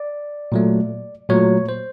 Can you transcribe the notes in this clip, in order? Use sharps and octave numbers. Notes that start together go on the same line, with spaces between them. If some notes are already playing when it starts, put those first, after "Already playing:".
Already playing: D5
A#2 F#3 A3
A#2 F#3 A3 C#5
C5